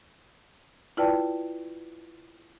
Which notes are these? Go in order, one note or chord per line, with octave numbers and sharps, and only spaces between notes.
E4 F4 B4 D5 G5 A5